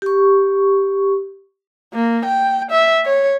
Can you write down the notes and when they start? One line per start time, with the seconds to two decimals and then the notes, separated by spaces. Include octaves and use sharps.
0.02 G4 C#6
1.93 A#3
2.25 G5
2.71 E5
3.05 C#5